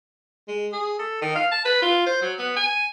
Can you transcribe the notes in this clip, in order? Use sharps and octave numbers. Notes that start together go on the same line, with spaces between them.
G#3
G#4
A4
D#3
F5
A5
B4
F4
C5
F#3
B3
G#5